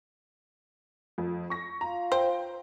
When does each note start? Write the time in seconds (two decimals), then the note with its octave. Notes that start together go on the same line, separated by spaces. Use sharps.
1.18 F2
1.50 C#6 A#6
1.81 F4 A#5
2.12 C5 G5